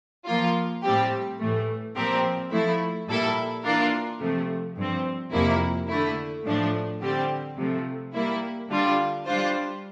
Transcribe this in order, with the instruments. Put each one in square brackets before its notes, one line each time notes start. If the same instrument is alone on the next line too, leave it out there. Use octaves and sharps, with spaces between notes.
[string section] F3 A#3 F4
A2 G3 C4 G4
A2 E3 A3
A#2 F3 C4 G4 A#4
F3 A3 E4
A#2 G3 A#3 E4 A4
E3 A#3 D4 F4 A#4
C3 F3 A3
G2 F3 C4
F2 C3 F3 A#3 E4
D3 A3 E4
A2 F3 A3 D4
D3 G3 C4 G4
C3 F3 A3
G3 A#3 E4
D3 G3 D4 F4
G3 D4 F4 C5